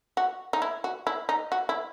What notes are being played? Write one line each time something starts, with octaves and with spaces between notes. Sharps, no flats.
F#4
D#4
E4
F#4
E4
D#4
F#4
E4